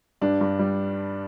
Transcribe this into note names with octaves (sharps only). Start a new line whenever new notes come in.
G2 D4
G2
G3